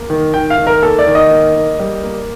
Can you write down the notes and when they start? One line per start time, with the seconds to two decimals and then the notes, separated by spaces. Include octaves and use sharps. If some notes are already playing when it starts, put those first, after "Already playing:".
Already playing: A#3
0.10 D#3
0.34 D#3 G5
0.50 F5
0.58 D#3
0.67 A#4
0.83 A#3 A4
0.99 D5
1.07 D#3
1.15 D#5
1.31 A#3
1.56 A#3
1.80 G3
2.03 A#3